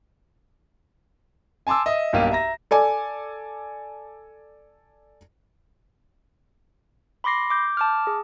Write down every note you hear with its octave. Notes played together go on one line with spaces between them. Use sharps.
G#5 A5 C6 D6 E6
D#5 E5 D#6
B1 G2 A#3 G4 F5 D#7
E5 A#5 A#6
A4 D5 G#5
B5 C6 D6 A#6 C7
D6 G6
A5 D6 F6
G#4